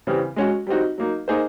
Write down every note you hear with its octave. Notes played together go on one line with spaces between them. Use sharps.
C#3 E3 G3 C4
G#3 C#4 F#4
G3 C4 D#4 F#4
F#3 A#3 D#4
A#3 D#4 G#4 C5